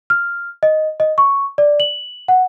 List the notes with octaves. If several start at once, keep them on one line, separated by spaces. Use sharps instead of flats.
F6
D#5
D#5
C#6
D5
F#7
F#5